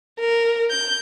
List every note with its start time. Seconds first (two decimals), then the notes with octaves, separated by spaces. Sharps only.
0.20 A#4
0.71 G6